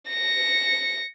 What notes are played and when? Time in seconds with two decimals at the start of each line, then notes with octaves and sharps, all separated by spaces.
0.10 A#6 C#7